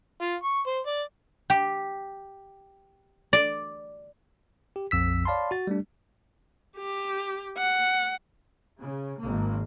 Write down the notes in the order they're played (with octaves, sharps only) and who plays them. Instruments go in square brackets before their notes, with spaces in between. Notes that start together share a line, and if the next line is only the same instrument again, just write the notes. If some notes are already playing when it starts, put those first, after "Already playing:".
[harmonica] F4
C#6
C5
D5
[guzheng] G4
D5
[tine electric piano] G4
A#1 F2 E6 B6
C#5 D5 F5 A5 B5 C6
F#4 A6
G3 A3 D4
[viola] G4
F#5
[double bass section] C#3
G#1 A#3